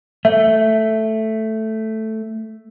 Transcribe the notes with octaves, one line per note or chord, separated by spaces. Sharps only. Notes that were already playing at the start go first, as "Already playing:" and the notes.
A3 E5